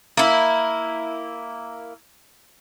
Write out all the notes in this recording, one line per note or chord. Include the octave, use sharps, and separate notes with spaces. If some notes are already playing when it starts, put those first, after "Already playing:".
A#3 E4